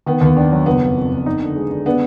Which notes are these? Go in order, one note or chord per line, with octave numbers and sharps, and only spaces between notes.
D#3 B3
D#2 B3
D#3 D4
F#3
F#1 B3
F2
F2
F2
D#4
D3
G#3
D3
B3 D4